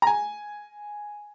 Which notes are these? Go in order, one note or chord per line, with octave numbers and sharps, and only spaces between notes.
A#5
G#5